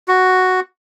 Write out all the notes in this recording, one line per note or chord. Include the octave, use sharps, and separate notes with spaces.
F#4